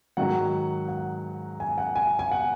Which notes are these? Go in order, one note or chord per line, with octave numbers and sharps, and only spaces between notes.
G#2 D#3 F#3 F#5
F#5
G#5
F#5
G#5
G#5
F#5